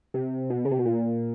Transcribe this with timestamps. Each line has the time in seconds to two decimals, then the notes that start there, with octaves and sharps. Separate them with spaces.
0.14 C3
0.50 B2
0.65 C#3
0.71 C3
0.78 B2
0.86 A#2